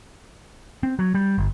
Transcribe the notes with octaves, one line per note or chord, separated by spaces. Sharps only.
C4
F#3
G3
G1